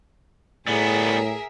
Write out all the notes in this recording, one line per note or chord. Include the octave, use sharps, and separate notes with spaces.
A2 G3 B3 G#4 A#4 E5